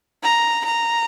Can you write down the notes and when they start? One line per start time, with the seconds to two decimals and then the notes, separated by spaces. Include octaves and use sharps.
0.23 A#5
0.65 A#5